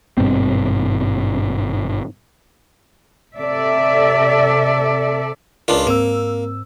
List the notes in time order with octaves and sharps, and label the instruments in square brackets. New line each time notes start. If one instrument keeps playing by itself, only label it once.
[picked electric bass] G#1 G2 B2 C4
[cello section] C3 A4 D5 E5
[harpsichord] C#2 D4 F4 [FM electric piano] A#4 D5
[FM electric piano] G#2 C4 E6 [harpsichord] A#3